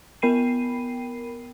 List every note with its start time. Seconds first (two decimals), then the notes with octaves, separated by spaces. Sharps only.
0.22 B3 A#4 G5 B5 C7 D#7